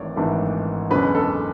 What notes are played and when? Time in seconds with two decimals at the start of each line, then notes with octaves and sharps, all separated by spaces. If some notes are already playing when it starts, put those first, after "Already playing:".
Already playing: G#1 G#2 E3 A3 D4 C#5 D5
0.16 G#1 G#2 E3 A3 D4
0.90 F#1 E2 D3 G#3 C#4 B4
1.15 A4